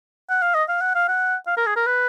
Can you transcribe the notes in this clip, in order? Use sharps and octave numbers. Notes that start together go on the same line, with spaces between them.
F#5
F5
D#5
F5
F#5
F5
F#5
F5
A#4
G#4
A#4
B4